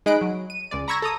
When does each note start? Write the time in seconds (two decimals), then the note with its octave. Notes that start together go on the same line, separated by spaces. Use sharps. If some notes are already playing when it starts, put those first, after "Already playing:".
0.06 G#3 D#4 D#5 B5 F#6 D7
0.21 F#3
0.50 D#7
0.71 C#2 G#3 D5
0.88 A#5 B5 C#6 E6 G#6 A#6
1.02 A4 A#5 D#6